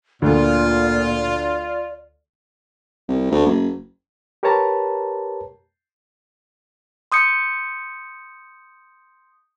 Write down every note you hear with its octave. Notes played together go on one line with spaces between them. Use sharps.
D2 A#2 F4 D5
C2
D2
F#1
G4 A#4 B4 C#5 A5 A#5
C6 D#6 G6 C#7